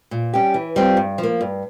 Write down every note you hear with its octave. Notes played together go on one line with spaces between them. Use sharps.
A#2
G3 C#4 G4
E3
G3 C4 F4
G2
F3
A#3
G2